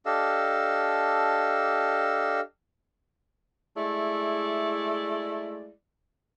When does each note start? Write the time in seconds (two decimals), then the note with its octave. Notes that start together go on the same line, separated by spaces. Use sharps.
0.06 D4 G4 A4 D#5 F5 E6
3.77 G#3 A3 E4 D5